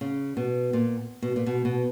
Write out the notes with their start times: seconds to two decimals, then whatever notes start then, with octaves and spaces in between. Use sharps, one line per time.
0.01 C#3
0.37 B2
0.73 A#2
1.22 B2
1.36 A#2
1.46 B2
1.65 B2